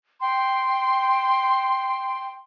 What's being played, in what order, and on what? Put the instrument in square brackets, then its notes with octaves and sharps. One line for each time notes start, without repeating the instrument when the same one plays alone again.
[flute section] G5 C6